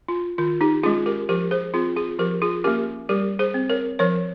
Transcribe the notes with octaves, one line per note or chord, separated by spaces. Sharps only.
F4
D#3 F4
D#4 G4
G#3 C#4 F4 G#4
G4 A#4
F3 G4 A#4
G#4 C5
C4 F4 G#4
F4 G#4
F3 G4 A#4
F4 G#4
A#3 C#4 G4 A#4
G3 G4 A#4
G#4 C5
C4
A#4 C#5
F3 A#4 C#5